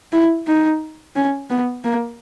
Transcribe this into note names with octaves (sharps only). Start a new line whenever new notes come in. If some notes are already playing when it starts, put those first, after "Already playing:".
E4
D#4
C#4
B3
A#3